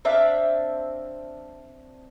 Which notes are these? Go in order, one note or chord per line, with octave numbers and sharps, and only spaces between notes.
C4 D4 E5 F5